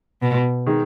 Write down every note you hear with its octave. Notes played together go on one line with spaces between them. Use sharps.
B2
D#3 G#3 D#4 G#4